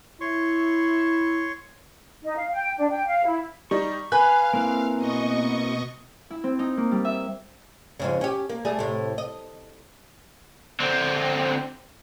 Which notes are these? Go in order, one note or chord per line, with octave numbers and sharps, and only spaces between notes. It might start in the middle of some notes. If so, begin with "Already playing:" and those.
E4 C#5 C6 C#6
D#4
F5
G5
D4
G5
F5
E4
G3 D#4 C#6
B4 F5 G#5 F#6
A#3 C4 E4
B2 D#5 C#6
E4
C4
D#4
A#3
G3
E5
F2 G#2 C#3
C#4 G4
A#3
G3 A3 G#4
A2 C3
D#5
D3 C4